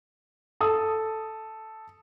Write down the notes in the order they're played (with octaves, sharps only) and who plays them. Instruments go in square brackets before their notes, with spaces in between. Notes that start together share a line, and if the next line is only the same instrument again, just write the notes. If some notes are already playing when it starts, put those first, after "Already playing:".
[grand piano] A4 D#6